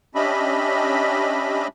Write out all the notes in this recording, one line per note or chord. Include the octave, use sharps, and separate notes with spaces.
C#4 D4 G4 D#5 E5 B5